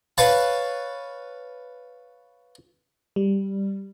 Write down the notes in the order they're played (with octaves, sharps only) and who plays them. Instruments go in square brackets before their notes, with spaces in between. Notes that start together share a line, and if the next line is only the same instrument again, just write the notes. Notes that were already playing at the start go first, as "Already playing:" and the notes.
[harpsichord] B4 C#5 F5 A5
[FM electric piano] G3